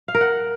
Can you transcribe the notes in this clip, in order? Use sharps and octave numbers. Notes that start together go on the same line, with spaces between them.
F5
A#4
F#5